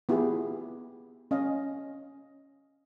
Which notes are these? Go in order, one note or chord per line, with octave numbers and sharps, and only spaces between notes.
B3 E4 F4 G4 G#4
C#4 D#5 F5